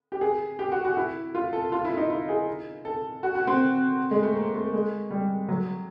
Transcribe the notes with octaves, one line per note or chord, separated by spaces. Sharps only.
G4
G#4
G4
F#4
F#4
E4
F4
A4
F4
E4
D#4
E4
G#4
A4
F#4
F#4
C4
G#3
A3
A#3
A3
G#3
G3
F#3